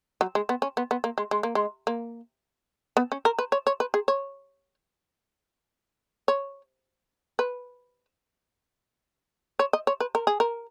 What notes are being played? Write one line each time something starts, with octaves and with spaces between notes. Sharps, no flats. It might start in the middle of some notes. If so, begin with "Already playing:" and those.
F#3
G#3
B3
C#4
B3
B3
A#3
G#3
G#3
A#3
G#3
A#3
B3
C#4
A#4
B4
C#5
C#5
B4
G#4
C#5
C#5
B4
C#5
D#5
C#5
B4
A#4
G#4
A#4